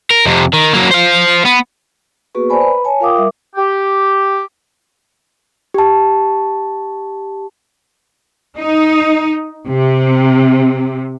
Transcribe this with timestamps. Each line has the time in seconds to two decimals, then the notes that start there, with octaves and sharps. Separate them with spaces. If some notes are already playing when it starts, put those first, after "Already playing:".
0.10 A#4
0.25 F2 C3
0.53 D#3
0.73 F#3 A#3
0.91 C5 F5
1.45 B3
2.35 A#3 B3 F#4 G#4 B4 C#6
2.50 B4 C5 D5 G#5 A5 B5
2.61 B4 A#5 B5
2.84 C#5 G#5 A5
3.00 F4 A#4 F5 G5 D6 D#6
3.16 G3 A#4 E5 D6
3.55 G4
5.74 G4 A5
8.58 D#4
9.69 C3